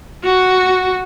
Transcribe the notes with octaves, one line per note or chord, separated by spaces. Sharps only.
F#4